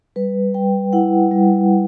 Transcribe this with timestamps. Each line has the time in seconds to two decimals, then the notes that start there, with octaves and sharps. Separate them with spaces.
0.16 G3 B4
0.54 G3 G5
0.93 E4 F#5
1.31 G3